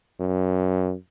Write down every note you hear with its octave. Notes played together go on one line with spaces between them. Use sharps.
F#2